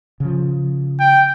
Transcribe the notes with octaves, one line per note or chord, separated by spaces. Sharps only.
C#3 F3
G5